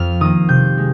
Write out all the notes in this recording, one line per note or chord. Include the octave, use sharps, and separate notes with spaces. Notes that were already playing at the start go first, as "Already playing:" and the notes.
Already playing: F2 F6
D#3 A#3 D#6
C3 G6
G#3